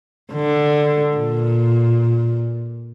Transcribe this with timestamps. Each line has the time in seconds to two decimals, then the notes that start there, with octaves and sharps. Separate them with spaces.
0.33 D3
1.17 A#2